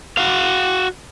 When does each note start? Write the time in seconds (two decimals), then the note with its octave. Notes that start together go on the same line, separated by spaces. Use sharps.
0.17 F#4 F5